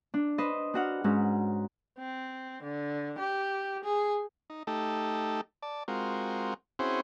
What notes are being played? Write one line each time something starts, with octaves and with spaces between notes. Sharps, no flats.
D4
B4 C5 D#5
D4 F#4 F#5 F6
G#2 C#4 F#4
C4
D3
G4
G#4
D#4
A3 D#4 G4 A4
D5 A5
G#3 C4 F4 F#4 A#4
C4 C#4 E4 F#4 G#4 C5